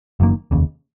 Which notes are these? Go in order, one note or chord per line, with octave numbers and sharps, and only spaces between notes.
F#1 F#2 D#3 A#3
F1 D#2 C#3